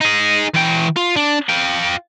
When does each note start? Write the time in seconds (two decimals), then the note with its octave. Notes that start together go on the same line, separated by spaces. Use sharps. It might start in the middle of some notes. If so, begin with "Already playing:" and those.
0.01 D#4 G#4
0.55 E3 G5
0.97 F4
1.16 D4
1.49 F4 G5